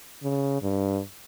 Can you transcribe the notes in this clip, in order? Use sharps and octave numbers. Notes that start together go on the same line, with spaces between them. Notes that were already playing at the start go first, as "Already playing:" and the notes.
C#3
G2